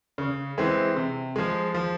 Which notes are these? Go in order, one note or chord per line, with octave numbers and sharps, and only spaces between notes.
C#3
E3 G#3 C4
C3
F3 G#3
F3